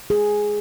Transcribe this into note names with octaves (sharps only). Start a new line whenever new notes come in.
G#4